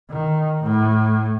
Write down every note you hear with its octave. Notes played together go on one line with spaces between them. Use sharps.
D#3
A2